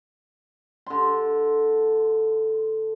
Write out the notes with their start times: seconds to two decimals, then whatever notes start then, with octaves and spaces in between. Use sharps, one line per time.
0.87 D3 C6